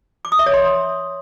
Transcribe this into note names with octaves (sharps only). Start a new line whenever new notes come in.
D6
D#6
E5
C#5
C6